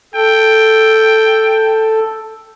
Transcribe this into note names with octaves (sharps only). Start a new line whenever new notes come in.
A4 G5